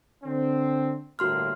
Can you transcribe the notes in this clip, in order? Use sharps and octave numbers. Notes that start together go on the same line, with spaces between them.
D3 C4
G1 A2 A#3 F#4 C6 F6